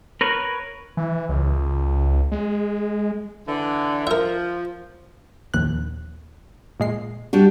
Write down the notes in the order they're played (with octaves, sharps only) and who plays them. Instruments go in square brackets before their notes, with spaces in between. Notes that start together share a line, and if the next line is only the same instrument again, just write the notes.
[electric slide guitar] A#4 B4 C#5
[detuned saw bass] E3
C#2
G#3
[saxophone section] D3 E3
[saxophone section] F3 [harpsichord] A#4 E5
[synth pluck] A#1 D#2 F#6
A#2 G#3 C7
[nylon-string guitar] G3 D4 F#4